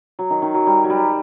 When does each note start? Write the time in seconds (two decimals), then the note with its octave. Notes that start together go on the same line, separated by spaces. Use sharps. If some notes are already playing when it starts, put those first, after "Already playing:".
0.19 F#3
0.30 D#3
0.42 D#3
0.54 F#3
0.67 G3
0.84 F#3
0.90 G3